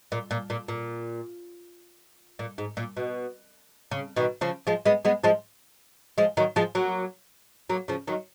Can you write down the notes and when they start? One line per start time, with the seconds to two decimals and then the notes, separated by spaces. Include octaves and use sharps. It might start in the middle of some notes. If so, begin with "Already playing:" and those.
0.12 A#2
0.31 A#2
0.50 A#2
0.68 A#2
2.39 A#2
2.58 G#2
2.77 A#2
2.97 B2
3.91 C#3
4.16 B2 D#3
4.41 C#3 F3
4.67 F3 G#3
4.85 G#3 B3
5.05 G#3 B3
5.24 F3 G#3
6.18 F3 G#3
6.37 D#3 F#3
6.56 F3 G#3
6.75 F#3 A#3
7.70 F#3 A#3
7.88 C#3 F3
8.07 D#3 F#3